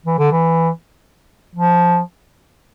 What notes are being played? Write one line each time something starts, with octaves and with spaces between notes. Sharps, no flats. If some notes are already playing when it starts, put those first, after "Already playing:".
E3
D3
E3
F3